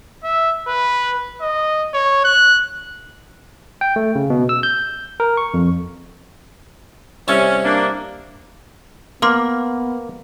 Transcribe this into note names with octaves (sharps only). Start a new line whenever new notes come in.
E5
B4
D#5
C#5
F#6
G5
A3
C#3
B2
E6
G6
A#4
C#6
F2
C2 C#4 E5 A5
A#3 D4
A#3 B3 C6 D6 F6